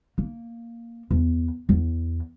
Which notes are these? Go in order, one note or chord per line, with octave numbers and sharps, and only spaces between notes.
A#3
E2
E2